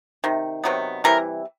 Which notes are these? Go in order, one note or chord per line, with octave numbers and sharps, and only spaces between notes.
C3 D#3
C3 D#3 F#3 B3
C3 E3 G3 A#4